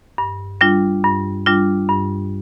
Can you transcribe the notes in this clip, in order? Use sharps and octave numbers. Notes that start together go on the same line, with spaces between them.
G2
G3 D4 F4
G2
G3 D4 F4
G2